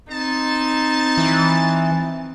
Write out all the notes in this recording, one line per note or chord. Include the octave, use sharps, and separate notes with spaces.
C4 D#4 A5
E3